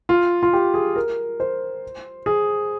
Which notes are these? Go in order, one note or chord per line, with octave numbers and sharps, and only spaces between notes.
F4
F4
G4
G#4
A#4
C5
G#4